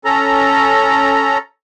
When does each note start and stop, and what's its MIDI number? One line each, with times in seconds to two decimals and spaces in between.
0.05 1.38 61
0.05 1.38 69
0.05 1.38 82